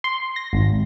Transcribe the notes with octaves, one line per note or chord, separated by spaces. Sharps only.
C6
A#6
G#1